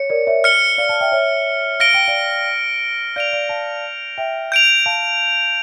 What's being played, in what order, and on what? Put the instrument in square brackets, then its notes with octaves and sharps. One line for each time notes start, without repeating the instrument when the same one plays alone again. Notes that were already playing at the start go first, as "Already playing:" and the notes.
Already playing: [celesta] C#5 [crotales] C#7
[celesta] A#4 D5
C#5 E5
[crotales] F6 C#7 G7
[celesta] D5 F5
F5 A5
E5 G5
C#5 E5
[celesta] F5 [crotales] F6 A#6 D7 G7
[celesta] G5
D5 F5
[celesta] D5 F5 [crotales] G6 D7 F7
[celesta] D5 F5
F5 A5
E5 G5
[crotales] G6 D7 F7
[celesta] F5 A5